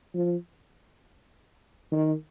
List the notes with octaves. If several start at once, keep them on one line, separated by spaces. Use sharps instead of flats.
F3
D#3